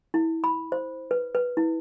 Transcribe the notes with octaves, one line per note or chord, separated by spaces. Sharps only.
E4
B5
C5
B4
B4
E4